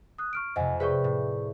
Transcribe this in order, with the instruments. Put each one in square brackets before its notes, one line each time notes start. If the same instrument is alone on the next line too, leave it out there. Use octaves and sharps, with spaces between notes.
[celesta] D#6 F#6
C#6 F6 D7
[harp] F2 C3 [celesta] D#5 F#5 G#5
[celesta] G#4 D5 C#6 [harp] B4 E5 G5
[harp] A2